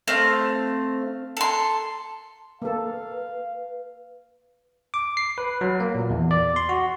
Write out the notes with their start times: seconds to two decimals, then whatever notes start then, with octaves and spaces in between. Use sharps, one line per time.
0.07 A3 C4 F5
1.37 A4 C6
2.62 A#3 A4 B4 F5
4.94 D6
5.17 C7
5.38 B4
5.61 F#3
5.80 A#3
5.95 A#2
6.10 E2
6.31 D5
6.56 C6
6.69 F#4